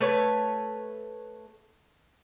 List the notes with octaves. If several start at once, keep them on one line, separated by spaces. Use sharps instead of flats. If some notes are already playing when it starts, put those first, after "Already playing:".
A3 B4 C#5